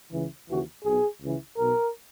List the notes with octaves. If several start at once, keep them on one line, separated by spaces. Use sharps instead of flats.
C#2 C#3 E3
D#2 C#3 E3 F#4
B1 B2 G#4
C#2 C#3 E3
B1 B2 A#4